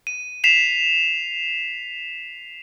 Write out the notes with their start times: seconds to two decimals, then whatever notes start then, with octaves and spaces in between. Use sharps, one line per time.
0.07 D#7
0.44 B6 C7 E7 F7